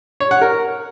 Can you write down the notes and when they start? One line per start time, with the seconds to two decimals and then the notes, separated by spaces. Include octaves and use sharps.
0.20 C#5
0.31 F#5
0.42 A#4